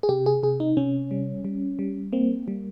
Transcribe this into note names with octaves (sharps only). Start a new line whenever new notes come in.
G#4
C3 G4
G#4
C3 G#4
D#4
C3 C#4
G3
G3
G3
A#3 C4
G3